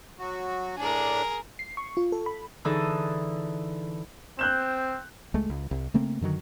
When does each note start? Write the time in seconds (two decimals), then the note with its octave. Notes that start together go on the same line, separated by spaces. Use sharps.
0.19 F#3 F#4
0.77 A2 D4 G#4 A#4
1.59 C7
1.77 C#6
1.97 F4
2.12 A4
2.26 B5
2.65 D3 E3 D#4 G#4 A4 D#6
4.39 C4 F#6 G6 E7
5.34 C#2 G#3 A3
5.50 C#2
5.71 C2
5.94 C#3 A3 A#3 C4
6.21 F#2 D3 D#3 F#3